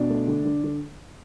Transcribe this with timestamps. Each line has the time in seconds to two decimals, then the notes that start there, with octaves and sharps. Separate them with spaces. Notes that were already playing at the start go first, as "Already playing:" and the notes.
Already playing: B2 D4 D5
0.10 A3
0.28 D3
0.45 D3
0.64 D3